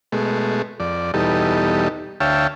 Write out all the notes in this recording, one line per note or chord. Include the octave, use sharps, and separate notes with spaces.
B2 G#3 A3
F2 D5
E2 B2 G3 D#4 A4
D2 C#5 E5 F5 G5 A5